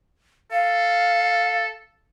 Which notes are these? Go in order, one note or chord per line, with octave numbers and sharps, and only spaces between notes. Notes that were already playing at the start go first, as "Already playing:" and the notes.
A4 F5